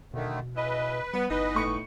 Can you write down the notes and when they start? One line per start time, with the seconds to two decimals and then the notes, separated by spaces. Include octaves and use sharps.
0.14 B2 D3 D#3 A3
0.56 C#3 E4 B4 D#5
1.14 G3 B3
1.30 G1 E3 B3 D#4 B4 D#5
1.54 A2 C#6 C#7